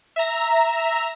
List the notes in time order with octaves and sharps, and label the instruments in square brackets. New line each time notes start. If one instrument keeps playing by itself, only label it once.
[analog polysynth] E5 A#5